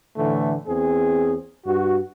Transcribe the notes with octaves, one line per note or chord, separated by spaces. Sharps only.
A2 D3 E3 A3
E2 C4 G#4
G2 F#4